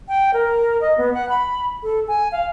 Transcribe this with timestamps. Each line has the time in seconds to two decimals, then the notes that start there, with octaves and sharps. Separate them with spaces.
0.08 G5
0.34 A#4
0.81 D#5
0.98 B3
1.14 F#5
1.29 B5
1.83 A4
2.08 G#5
2.32 F5